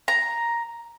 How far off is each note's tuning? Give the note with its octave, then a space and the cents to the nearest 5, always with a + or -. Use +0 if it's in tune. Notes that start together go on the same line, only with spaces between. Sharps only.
A#5 +5